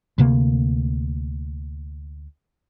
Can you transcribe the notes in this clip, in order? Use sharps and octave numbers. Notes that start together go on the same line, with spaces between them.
D2 C3 A#3